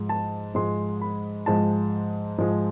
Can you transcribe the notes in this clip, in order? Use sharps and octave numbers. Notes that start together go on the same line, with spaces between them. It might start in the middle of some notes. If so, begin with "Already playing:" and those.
Already playing: G#2 F3 G#3
A5
G#2 F3 G#3 C6
B5
G#2 F3 G#3 A5
G#2 F3 G#3